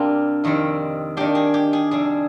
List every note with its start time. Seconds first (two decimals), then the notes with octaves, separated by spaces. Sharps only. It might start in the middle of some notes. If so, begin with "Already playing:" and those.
Already playing: C3 G3 A#3 D4 F4 G4
0.44 F2 D#3 G3 C4
1.17 D#3 A#3 D4 G4
1.35 G#4
1.54 G4
1.73 G#4
1.91 F2 C3 G3 D4 G#4